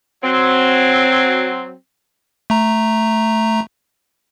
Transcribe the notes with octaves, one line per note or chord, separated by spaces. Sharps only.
F#3 C4
A3 A#5